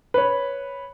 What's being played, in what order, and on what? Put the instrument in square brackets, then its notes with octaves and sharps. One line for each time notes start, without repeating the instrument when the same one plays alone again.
[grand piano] B4 C#5